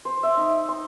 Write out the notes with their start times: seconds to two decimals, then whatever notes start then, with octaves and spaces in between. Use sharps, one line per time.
0.05 C5
0.23 E5
0.37 D#4
0.69 C6